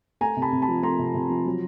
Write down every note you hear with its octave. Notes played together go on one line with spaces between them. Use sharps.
A3 G#5 A#5
C3
A5 B5
C3
A5 B5
F3
A3 A#5 C6
C3
C3
F3
F#3